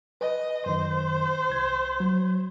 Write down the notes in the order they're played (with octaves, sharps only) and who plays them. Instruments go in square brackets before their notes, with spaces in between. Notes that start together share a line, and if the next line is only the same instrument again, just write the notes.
[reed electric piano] B4 [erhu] D#5
[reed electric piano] F#2 D#3 [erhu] C5
[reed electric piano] C2 G#6
F#3